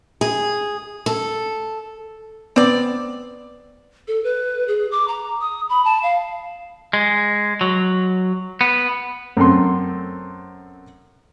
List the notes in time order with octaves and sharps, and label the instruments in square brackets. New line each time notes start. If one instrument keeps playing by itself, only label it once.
[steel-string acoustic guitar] G#4
A4
[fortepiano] B3 [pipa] C4 D5
[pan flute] A4
B4
G#4
D6
A#5
D#6
B5
A5
F5
[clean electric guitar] G#3
F#3
B3
[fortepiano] F#2 A3 C4 C6